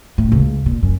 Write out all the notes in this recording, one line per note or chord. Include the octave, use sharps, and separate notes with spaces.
A2
C#2
A#2
F#2